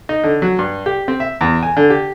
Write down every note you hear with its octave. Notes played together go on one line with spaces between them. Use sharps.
D#4
D3
F#3
G2
G4
C4
E5
E2
G#5
D3
G4